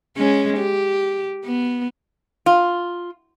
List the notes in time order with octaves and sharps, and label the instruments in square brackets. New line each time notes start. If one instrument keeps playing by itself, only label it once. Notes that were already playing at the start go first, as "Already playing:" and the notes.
[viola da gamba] G#3 C#4
G4
B3
[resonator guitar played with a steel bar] F4